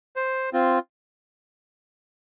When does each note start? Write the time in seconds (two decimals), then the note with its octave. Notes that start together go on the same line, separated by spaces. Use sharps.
0.16 C5
0.53 C4 F4